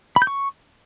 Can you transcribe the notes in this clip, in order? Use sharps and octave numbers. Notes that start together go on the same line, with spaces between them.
B5
G6
C#6